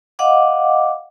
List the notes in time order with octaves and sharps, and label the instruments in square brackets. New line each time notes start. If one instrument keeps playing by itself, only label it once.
[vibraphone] D#5 F5 F#5 D6